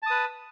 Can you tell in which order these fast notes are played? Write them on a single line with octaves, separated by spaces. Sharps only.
A5 D#6 B4